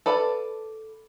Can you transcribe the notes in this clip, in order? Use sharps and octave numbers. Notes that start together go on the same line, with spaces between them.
A4 B4 D5 F5